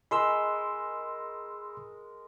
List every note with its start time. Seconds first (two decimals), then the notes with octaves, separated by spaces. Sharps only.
0.11 G#3 A#4 B5 C6 E6